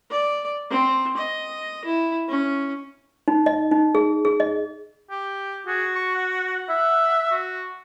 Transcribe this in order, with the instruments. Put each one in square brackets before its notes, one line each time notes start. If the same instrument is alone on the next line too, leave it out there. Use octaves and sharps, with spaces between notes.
[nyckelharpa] D5
C4
D#5
E4
C#4
[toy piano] D#4
D#5
D#4
G#4
G#4
D#5
[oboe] G4
[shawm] F#4 [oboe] G#4
[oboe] C#6
F#5
[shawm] E5
[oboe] F#4